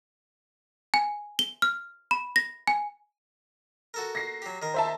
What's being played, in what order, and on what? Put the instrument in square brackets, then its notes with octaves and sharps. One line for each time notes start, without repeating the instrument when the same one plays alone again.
[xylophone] G#5
G7
F6
B5
A#6
G#5
[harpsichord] F#4 A4 A#4
[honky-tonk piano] A#6 C7
[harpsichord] F#3 G4
D#3 A#4
[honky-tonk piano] C5 E5 A5